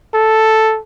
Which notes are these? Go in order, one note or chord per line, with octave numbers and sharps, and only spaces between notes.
A4